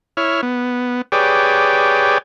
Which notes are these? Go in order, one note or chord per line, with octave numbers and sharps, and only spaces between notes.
E4 C#5 F6
B3
G4 G#4 B4 C#5 D5 G5